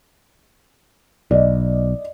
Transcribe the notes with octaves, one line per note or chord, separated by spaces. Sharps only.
B1 D5 D#5